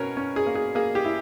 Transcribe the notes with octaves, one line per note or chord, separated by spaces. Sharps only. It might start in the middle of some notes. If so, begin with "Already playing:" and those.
Already playing: B2 C#4 A#4 B4 C#5
C#4
G#4
A#3
G#4
A#3 G#4
G4
E4